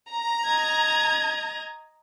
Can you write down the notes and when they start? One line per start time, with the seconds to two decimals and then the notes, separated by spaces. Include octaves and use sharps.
0.11 A#5
0.46 D#5 G#6